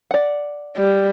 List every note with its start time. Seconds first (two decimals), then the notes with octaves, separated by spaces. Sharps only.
0.11 D5 F#5
0.77 G3